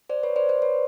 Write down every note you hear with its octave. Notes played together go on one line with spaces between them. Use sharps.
C5 D5
B4 C#5
C5 D5
C5 D5
B4 C#5